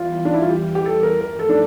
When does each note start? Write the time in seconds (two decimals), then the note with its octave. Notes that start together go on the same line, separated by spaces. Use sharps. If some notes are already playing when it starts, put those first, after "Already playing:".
Already playing: E2 E3 G3 F4
0.25 D4
0.34 E4
0.42 F4
0.49 G4
0.75 G4
0.85 A4
1.03 A#4
1.21 G2 F3 A3 A#4
1.39 A4
1.49 D4